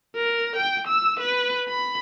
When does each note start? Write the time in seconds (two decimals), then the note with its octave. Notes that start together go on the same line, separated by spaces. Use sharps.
0.15 A#4
0.56 G5
0.87 E6
1.20 B4
1.69 B5